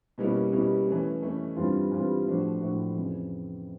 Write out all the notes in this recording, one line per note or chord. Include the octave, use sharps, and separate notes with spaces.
B2 G3 A#3 C#4 E4
B2 G3 A#3 C#4 E4
E3 A3 C#4
E3 A3 C#4
G2 E3 G3 C4 F4
G2 E3 G3 C4 F4
A2 F3 A3 D4 F#4
A2 F3 A3 D4 F#4
F2 C#3 E3